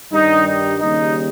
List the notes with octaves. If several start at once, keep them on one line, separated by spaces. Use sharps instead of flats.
G2 D#3 G3 D#4
D#4
D#2 C#3 G3 D#4